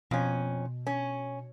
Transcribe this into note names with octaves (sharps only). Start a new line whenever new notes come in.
F2 B2 C#4
C#4